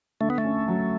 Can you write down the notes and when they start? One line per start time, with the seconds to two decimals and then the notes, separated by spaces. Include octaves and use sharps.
0.21 D3 A3
0.30 B3
0.38 A3
0.44 C#4
0.68 F#3